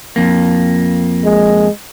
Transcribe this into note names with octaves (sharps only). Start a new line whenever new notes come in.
F2 A#3
G#3